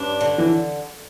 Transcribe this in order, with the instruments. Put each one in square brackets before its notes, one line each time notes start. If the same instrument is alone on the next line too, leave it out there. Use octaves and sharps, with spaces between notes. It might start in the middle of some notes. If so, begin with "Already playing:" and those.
Already playing: [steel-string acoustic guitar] G2 D4 [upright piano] C#4
[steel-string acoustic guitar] D3
[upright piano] E3